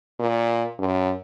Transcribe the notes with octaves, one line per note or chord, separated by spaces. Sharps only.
A#2
F#2